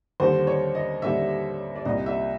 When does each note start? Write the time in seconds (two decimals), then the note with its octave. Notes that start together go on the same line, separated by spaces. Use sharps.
0.20 D#2 D3 G3 C5
0.47 C#5
0.75 D#5
1.02 D#2 D3 G3 E5
1.76 D5
1.85 C2 A#2 G3 D#5
2.06 E5